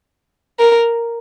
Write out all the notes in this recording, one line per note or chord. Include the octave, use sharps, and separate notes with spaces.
A#4